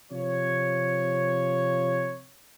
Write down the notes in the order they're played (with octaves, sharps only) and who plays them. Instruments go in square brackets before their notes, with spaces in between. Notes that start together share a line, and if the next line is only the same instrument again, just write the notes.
[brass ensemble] C3 F3 C#5